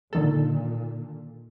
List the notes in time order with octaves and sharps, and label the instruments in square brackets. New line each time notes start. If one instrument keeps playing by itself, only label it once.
[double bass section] A#2 [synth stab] D3 D#3 A4